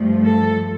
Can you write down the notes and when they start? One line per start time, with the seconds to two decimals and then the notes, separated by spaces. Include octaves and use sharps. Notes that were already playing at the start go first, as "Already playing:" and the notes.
Already playing: G2 F3 A3
0.24 A4